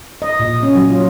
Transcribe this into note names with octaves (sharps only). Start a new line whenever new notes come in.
D#5
A#2
C#4
F#3
F4